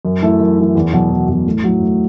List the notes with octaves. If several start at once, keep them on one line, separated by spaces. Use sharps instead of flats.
F#2
E3 A3 E4
F#2
E3 A3 E4
E2
B2 F#3
E2
B2 F#3
A2
F#3 A3 E4
A2